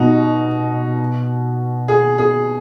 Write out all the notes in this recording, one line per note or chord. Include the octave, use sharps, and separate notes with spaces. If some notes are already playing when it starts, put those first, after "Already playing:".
Already playing: B2 D#4 F#4
G#4
G#4